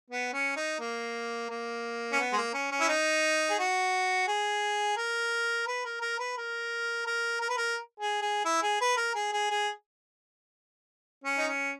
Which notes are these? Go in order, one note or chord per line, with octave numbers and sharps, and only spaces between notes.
B3
C#4
D#4
A#3
A#3
C#4
B3
G#3
A#3
C#4
C#4
E4
D#4
G#4
F#4
G#4
A#4
B4
A#4
A#4
B4
A#4
A#4
A#4
B4
A#4
G#4
G#4
E4
G#4
B4
A#4
G#4
G#4
G#4
C#4
D#4
C#4